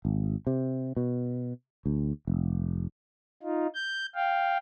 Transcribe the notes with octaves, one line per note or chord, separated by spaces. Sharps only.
G#1
C3
B2
D2
F1
D#4 F4
G6
F5 G5